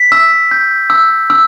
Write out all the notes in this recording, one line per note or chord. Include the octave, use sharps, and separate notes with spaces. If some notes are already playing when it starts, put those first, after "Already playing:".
Already playing: B6
E6
G6
E6
E6